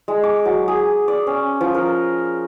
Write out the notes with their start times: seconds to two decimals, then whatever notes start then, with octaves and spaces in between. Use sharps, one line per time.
0.08 G#3
0.23 D6
0.45 F#3
0.68 G#4
1.08 D5
1.27 C#4
1.61 F3
1.75 A#4